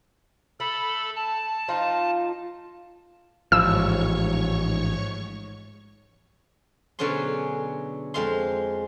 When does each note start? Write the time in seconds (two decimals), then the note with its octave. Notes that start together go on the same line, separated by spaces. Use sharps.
0.60 A3 A4 B5
1.15 A5
1.68 F3 D#4 F4
3.52 A1 G#2 F3 C#5 C#6 E6
6.99 B2 D3 F#3 C#4 G#4 C6
8.14 F2 G#3 F5 C6